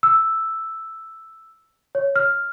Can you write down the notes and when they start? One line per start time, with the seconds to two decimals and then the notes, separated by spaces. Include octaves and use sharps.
0.03 E6
1.95 C#5
2.16 F6